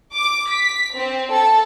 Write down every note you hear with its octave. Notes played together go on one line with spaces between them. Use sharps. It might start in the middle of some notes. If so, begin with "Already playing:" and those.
D6
B6
C4
A4